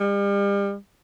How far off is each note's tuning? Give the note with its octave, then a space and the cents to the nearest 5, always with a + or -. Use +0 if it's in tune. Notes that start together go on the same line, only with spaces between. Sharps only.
G3 +40